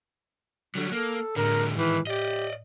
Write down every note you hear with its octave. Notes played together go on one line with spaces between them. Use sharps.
D3 F#3 G3
A#3 A4
A2 D3 G#3 A#4
G#2 D#3 E3
G4 D5 D#5